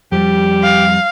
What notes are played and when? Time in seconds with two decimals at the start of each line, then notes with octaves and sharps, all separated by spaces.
0.12 F2 G3 G4
0.63 F5